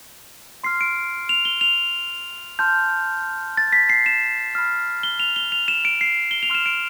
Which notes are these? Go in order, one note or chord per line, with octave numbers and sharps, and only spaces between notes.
C6 F6 C7
D7
F7
G7
F7
A5 C6 F6 G6
A6
B6
C7
E7
B5 F6
G7
F7
G7
F7
E7
D7
C7
G7
F7
C6 F6 E7
D7